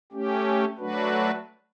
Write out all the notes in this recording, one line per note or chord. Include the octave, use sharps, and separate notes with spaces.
A3 C#4 G4
F#3 A3 D4 F#4 B4